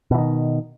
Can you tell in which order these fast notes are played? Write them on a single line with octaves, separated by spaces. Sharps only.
B2 E3 D#3